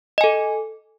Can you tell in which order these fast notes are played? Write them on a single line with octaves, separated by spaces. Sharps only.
D#5 G#5 A4